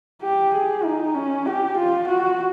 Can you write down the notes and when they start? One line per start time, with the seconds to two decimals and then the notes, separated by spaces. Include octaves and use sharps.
0.23 G4
0.54 G#4
0.84 D#4
1.15 C#4
1.46 G4
1.77 F4
2.08 F#4